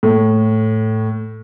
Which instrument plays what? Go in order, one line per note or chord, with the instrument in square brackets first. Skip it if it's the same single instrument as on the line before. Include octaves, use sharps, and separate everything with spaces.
[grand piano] A2